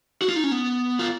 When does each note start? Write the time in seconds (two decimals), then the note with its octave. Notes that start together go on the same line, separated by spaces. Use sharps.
0.22 F#4
0.29 F4
0.36 D#4
0.44 C#4
0.52 B3
0.99 F4